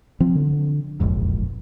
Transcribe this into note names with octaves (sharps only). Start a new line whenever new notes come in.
F3 C4
D3
E1 A#1 F2 G#2